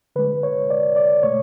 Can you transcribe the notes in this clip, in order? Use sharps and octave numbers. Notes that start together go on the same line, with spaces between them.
D3 G#3 B4
C#5
D5
D5
B2 A3 C#5